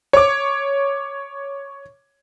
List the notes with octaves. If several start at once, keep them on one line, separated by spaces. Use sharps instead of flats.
C#5 D6